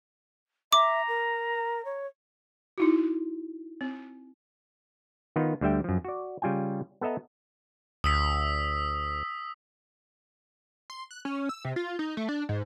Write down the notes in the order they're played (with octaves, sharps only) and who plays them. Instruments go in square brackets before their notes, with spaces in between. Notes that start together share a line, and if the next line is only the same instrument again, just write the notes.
[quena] E5 [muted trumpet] A#5 [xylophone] D6
[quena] A#4
C#5
[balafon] D#4 E4 F#4
C4
[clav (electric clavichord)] D#3 B3 D#4 F4
D2 D3 G3 E5 G5
F#2 F3
F#4 D5
C#3 G3 F4 G5 G#5
B3 A4 D#5 E5 A#5
[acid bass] D2 [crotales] D#6 E6 B6
[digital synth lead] C6
F#6
C#4
E6
C3
F4
D#4
A3
D4
G#2